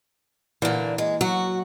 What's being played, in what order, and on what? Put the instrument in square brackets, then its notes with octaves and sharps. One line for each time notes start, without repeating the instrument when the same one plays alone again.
[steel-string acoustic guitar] A#2 D3 [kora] E3 A#3
[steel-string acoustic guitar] G#3
[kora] F#3 [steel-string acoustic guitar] F#4